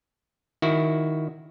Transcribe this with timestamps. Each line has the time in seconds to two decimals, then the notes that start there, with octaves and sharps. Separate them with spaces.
0.62 D#3 E4 F#4